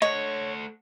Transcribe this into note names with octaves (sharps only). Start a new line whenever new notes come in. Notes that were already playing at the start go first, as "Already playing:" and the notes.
A3 C#5 D#5 F#5